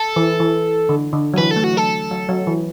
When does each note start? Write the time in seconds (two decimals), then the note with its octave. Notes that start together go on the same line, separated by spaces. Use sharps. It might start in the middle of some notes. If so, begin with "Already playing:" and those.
Already playing: A4
0.16 E3
0.40 E3
0.89 D3
1.13 D3
1.34 F#3
1.37 E3 B4
1.51 A4
1.56 A3
1.64 F#4
1.74 F#3 A4
2.11 F#3
2.29 F#3
2.47 E3